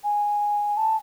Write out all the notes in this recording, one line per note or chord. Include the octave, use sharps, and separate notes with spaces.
G#5
A5